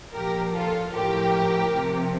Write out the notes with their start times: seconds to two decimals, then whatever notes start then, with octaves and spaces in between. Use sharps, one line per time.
0.14 A#2 F3 G4 A#4
0.53 F4 A4
0.91 A2 F3 G4 A#4
1.71 C3 F3